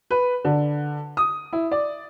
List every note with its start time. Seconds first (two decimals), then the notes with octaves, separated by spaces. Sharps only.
0.11 B4
0.45 D3
1.17 D#6
1.53 E4
1.71 D5